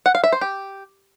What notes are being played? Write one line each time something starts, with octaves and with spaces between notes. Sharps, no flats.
F#5
F5
E5
C5
G4